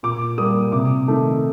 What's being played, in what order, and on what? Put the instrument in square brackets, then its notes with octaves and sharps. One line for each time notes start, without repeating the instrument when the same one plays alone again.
[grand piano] A#2 D6
G3 A#3 D#6
C3 D6
D#3 A3